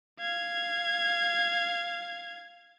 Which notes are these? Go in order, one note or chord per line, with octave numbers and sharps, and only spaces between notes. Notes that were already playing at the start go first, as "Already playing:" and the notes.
F5 G#6